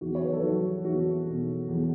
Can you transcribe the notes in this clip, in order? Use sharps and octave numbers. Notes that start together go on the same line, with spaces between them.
E2 F#4
C#5
B4
A4
F#3 F#4
E2 F#4
B2
E2